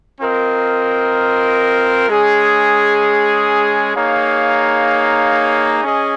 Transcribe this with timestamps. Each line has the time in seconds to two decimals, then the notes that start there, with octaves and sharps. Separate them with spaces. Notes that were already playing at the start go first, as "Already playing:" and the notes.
0.20 C4 F4 A#4 D#5
2.08 G#3 C#4 G#4
3.96 A#3 D#4 G#4 C#5 F5
5.83 C#4 G#4 D#5